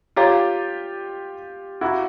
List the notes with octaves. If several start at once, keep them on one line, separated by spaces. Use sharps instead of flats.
F4 G4 C#5 F5 A#5 D6
E4 F#4 F5 A#5 D6 F#6